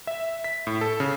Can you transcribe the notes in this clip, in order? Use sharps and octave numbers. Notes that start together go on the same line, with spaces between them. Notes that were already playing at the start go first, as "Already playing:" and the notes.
E5
B6
A2
A4
C#3